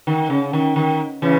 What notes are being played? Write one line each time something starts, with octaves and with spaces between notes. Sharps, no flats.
D#3
C#3
D#3
D#3
C#3 E3